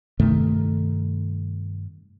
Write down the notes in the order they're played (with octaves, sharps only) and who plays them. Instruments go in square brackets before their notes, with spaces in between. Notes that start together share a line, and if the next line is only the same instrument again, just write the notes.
[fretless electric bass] G2 C3 D#3 A3